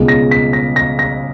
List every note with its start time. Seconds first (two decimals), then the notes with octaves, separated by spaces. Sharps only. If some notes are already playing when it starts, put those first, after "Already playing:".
Already playing: C#2 B2 G#3
0.08 A#6
0.31 B6
0.53 A#6
0.76 A#6
0.99 A#6